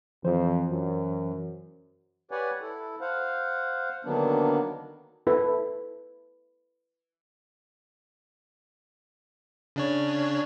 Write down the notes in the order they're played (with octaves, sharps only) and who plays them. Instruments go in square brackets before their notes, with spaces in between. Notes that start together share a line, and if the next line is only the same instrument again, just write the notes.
[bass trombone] F2 [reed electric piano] E3 C5
[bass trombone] F#2
[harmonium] G4 B4 C#5 D5 F#5 G#5
E4 A4
C5 F5 F#5
D3 D#3 F#3 A#3 B3 D4
[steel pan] E4 A4 B4
[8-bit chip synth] C#3 D4 C#5